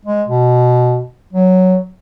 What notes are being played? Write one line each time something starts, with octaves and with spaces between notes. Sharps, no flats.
G#3
B2
F#3